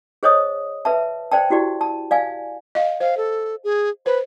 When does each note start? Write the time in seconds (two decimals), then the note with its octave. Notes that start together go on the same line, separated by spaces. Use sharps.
0.23 G#4 C5 C#5 D#5 D#6
0.85 B4 E5 A5
1.31 C5 D5 G5 A5
1.50 E4 F#4 G4 D5
1.81 A5
2.11 D5 F5 G#5
2.75 D#5 F5
3.00 C5 F5
3.17 A4
3.64 G#4
4.06 B4 C5